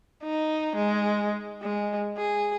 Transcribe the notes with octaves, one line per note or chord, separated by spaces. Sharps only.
D#4
G#3
G#3
G#4